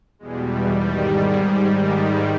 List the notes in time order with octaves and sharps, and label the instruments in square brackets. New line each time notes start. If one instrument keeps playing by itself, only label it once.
[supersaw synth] E2 B2 G3 G#3
G#2 D#3 G3
G#2 G3 G#4
G#2 D#3 G3 A#4